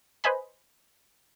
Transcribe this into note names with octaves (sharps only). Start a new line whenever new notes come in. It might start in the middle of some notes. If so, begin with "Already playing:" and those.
B4 C5 D#5 G#5 B5